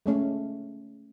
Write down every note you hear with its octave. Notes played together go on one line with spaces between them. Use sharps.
G#3 A3 C#4